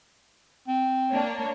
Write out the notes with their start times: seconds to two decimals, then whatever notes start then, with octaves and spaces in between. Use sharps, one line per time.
0.68 C4
1.12 A#3 D4 C#5